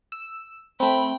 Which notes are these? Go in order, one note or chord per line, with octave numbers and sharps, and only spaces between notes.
E6
A3 C4 G5 B5